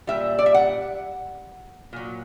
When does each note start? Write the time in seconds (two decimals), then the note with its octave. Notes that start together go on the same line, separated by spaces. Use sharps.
0.07 A#2 G3 E5
0.39 D5
0.46 E5
0.54 F#5
1.93 A#2 F#3